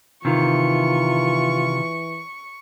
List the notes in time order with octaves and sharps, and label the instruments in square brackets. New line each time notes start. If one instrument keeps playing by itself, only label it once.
[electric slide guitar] C3 D#3 [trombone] E3 [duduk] F4 [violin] C#6